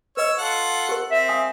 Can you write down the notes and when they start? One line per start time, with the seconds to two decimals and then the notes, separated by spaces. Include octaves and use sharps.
0.17 B4 C#5 D#5 C#6 E6
0.38 F4 A4 F#5
0.89 G4 A#4
1.11 C4 E5
1.28 F5 G#5 D#6